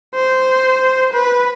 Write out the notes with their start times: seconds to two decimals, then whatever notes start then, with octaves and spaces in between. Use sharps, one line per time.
0.15 C5
1.13 B4